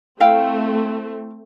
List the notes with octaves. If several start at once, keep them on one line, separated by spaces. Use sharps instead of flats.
A3 C4 E4 F5 G5